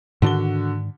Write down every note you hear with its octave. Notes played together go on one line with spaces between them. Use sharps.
G#2 D3 D#3 D4 F#4 G7